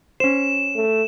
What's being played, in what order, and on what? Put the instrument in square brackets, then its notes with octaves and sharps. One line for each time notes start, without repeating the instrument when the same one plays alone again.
[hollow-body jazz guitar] C#4 C5 [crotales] E7
[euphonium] A3